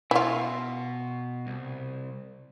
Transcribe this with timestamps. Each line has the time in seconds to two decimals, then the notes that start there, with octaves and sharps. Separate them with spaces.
0.11 B2 E4 F4
1.47 C2